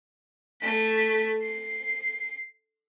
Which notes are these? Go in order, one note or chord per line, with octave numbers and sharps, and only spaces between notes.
A3 B6
C7